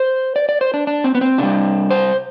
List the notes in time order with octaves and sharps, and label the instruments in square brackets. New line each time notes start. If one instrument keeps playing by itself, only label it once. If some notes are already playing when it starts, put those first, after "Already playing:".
Already playing: [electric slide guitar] C5
D5
D5
C5
D4
D4
C4
B3
C4
C3 G3 D4
C5